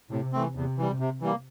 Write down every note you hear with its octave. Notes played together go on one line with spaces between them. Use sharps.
A2 C3
E3 A3 C4
E2 C3
E3 G3
C3
E3 G3 A#3